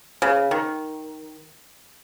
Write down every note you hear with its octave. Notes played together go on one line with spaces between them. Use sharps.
C#3
D#3